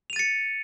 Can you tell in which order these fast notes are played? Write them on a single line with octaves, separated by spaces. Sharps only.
F7 D#7 A6 C#7